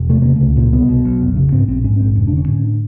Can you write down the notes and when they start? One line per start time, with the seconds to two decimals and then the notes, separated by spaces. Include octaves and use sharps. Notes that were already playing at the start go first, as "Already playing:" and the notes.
Already playing: E1
0.09 C3 A3
0.22 C#3 A#3
0.36 A3
0.41 C#2
0.56 A#2 A#3
0.72 C2 B3
0.89 B2
1.05 B1
1.21 F1
1.36 C#3
1.52 G#2 C4
1.68 A#1 C4
1.84 G#2 C#4
2.00 A#1 C4
2.16 F1 C#4
2.27 D4
2.32 D3 C#4
2.48 A2 C#4
2.64 D4